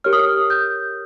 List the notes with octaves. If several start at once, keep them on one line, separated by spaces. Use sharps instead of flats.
G4 A#4 C#5 F6
D#6
F6
G6